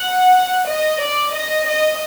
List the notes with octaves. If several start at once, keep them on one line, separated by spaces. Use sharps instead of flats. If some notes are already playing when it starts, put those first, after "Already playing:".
Already playing: F#5
D#5
D5
D#5
D#5